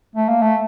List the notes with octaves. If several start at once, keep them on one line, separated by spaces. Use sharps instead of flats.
A3
A#3
A3